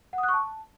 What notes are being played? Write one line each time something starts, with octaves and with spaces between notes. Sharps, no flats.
F#5
D#6
F#6
C#6
A5